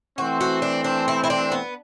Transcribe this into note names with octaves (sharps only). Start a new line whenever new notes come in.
E3 A3 C4 F#4
F#4
D4
D4
E4
E4
D4
B3